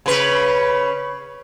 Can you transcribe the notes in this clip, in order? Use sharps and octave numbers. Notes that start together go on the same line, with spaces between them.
C#3 B4